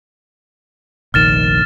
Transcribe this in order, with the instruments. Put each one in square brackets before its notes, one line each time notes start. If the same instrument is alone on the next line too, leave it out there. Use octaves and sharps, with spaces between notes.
[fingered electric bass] F1 A#1 D#3 [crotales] F6 A6 E7